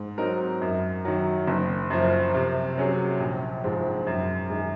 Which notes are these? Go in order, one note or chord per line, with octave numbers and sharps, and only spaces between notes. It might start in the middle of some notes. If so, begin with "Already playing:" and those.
Already playing: G#2
F#3 C4 D#4 A#4
F#2
D#3 F#3
F#1
F#2 F3
C3
F#3 C#4 G#4
A#1
G#2 F3 G#3
F#2
D#3 G#3